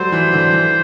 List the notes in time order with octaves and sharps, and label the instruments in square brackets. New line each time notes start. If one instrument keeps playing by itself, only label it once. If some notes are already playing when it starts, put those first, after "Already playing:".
Already playing: [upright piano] F#3 G3 A3 [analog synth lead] C5
[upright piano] E3
D3
E3